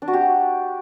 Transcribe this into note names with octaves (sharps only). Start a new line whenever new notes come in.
D4
F#4
G4